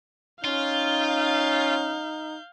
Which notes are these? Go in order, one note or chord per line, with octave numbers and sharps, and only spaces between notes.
C#4 D#4 F4 F5 G6